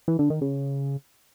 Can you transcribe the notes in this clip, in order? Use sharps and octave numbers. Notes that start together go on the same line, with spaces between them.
E3
D3
D#3
C#3